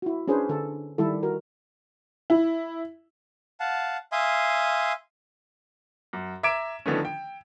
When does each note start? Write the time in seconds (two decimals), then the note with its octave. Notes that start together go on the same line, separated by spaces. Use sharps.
0.02 E4 F#4
0.28 C#4 D4 G#4 B4 C5
0.49 D3 A4
0.98 D#3 G3 E4 A4
1.23 F#4 A#4
2.30 E4
3.60 F5 F#5 A5
4.12 E5 F5 G#5 C6 D#6
6.13 F#2
6.43 E5 A#5 D6 G#6 D7 E7
6.86 D3 D#3 F3 A3 B3 C#4
7.05 G5